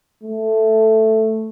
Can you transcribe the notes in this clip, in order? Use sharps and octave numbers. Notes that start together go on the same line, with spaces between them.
A3